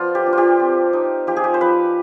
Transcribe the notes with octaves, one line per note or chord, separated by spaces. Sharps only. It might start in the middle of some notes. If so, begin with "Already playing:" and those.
Already playing: F3 B3 F4 C5 D5
G4
D4
F4
G4
C4
D#4
F3 G4
G#4
G4
C5
F3 B4